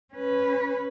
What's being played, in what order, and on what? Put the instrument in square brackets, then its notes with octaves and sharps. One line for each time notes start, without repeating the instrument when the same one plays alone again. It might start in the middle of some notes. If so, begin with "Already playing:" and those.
[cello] C#4 B4